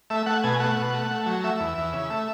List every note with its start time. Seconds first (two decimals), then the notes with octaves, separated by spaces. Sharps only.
0.10 A3 E5
0.26 A3 F#5
0.44 B2 G#5
0.60 A3 F#5
0.77 B2
0.94 A3
1.11 A3
1.26 F#3
1.44 A3 E5
1.60 E2
1.78 E2
1.93 C#3
2.10 A3